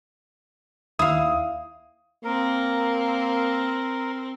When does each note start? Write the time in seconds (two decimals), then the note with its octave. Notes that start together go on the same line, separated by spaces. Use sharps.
0.99 D#2 E4 F5 D#6
2.25 A#3 C4 A#4